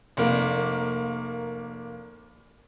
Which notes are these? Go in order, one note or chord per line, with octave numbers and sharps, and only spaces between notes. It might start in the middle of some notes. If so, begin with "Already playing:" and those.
F1 A#3